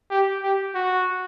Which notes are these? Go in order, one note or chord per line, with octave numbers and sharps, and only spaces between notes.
G4
G4
F#4